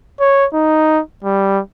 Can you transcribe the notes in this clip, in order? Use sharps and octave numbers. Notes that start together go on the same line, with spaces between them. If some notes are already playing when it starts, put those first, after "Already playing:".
C#5
D#4
G3